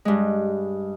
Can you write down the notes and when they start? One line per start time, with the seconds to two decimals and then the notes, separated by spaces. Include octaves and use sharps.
0.05 G2 G#3